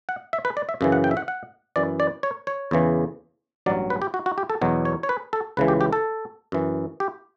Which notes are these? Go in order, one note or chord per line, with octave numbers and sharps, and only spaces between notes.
F#5
E5
B4
D5
E5
F#2 C#3 E3
F#5
G5
E5
F#5
F#5
F#2 E3 D5
D5
C#5
C#5
E2 C#3 E3
A1 G2 F#3 D5
B4
G4
F#4
F#4
G4
A4
E2 B2 F#3
C#5
C#5
B4
A4
C#2 C#3 E3 B4
G4
G4
A4
F#2 E3
G4